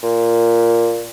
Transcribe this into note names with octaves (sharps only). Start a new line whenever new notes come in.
A#2